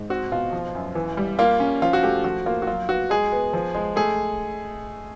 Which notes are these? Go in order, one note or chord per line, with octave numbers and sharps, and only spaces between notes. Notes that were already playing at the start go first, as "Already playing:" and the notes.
Already playing: G#2
C4 F#4
B2 F4
F3
F#2
E3
G3
A#3 F4
C#4
F3 F4
F#4
A3 G4
F3 F#4
A#3 F4
F#4
F#3 F4
B3 F#4
G#3 G#4
B3
F3
G#3
A3 G#4